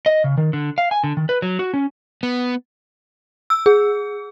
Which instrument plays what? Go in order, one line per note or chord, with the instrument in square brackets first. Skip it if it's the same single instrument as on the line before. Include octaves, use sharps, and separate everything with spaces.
[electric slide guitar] D#5
C#3
D#3
D3
F5
G#5
D3
D#3
B4
F#3
F#4
C#4
B3
[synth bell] E6
G#4